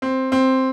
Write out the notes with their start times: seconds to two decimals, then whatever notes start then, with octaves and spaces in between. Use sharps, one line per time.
0.02 C4
0.32 C4